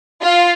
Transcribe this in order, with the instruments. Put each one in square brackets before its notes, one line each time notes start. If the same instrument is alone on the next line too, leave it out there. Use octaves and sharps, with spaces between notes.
[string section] F4